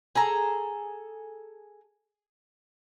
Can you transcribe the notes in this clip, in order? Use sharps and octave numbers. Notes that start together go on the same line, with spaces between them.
G#4 A4 A#5